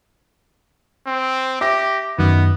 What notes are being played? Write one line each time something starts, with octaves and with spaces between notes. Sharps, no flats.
C4
G4 E5 D6 A#6
F#2 D#3 B3